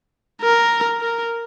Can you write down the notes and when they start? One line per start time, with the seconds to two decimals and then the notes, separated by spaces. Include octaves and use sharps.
0.42 A#4
1.01 A#4